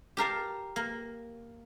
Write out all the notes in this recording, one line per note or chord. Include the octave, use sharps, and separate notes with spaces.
G4 A#4 F5 A5
A#3